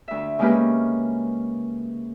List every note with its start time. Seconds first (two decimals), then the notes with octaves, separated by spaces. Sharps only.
0.08 D2 E5
0.39 C#3 G#3 A#3 C#4 G4 B4